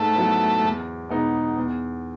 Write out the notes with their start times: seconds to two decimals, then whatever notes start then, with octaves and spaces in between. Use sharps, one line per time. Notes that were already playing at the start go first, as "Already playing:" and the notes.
Already playing: G#2 A3
0.15 F#3 B3 E4
0.62 E2
1.09 B2 G#3 B3 D#4
1.57 E2